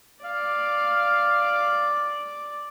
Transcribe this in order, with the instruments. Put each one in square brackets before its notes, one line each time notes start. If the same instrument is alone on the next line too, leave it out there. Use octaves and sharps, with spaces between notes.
[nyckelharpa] D5 [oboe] F5